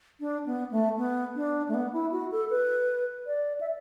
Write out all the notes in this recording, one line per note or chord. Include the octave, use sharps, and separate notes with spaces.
D4
B3
A3
B3
D4
A3
B3
E4
F#4
A4
B4
D5
E5